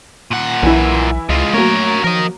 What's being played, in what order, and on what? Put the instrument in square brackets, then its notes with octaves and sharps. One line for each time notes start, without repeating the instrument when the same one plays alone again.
[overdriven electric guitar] A#2 F#5
[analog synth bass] B1 [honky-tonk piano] E3 E4
[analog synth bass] C#2 [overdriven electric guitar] G#3 F4
[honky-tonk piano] F#3 A#3 [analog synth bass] A3 [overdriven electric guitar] A#4 C#5
[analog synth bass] F3 [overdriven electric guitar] A#4 D#5